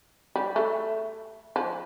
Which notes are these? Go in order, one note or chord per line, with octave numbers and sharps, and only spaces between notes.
G3
A3
F3